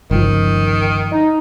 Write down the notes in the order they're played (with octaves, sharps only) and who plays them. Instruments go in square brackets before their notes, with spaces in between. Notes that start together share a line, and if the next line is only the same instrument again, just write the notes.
[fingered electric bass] G1 C#2 F3 [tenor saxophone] D#3
[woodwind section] D#4